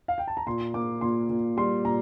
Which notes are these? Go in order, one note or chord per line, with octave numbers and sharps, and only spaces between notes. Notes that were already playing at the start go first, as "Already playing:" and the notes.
F5
G5
A5
A#5
A#2 C6
A#3 D6
A#2 C6
A#2
G3 C6
A#2 A#5